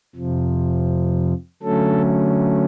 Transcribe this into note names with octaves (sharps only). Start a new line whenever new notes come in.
F2 C3 F3
D3 F#3 A3 C#4 A4